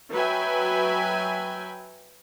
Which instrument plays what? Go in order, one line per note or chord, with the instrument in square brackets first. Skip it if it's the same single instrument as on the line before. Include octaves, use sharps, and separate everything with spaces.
[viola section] F#3 B4 E5 G5 G#5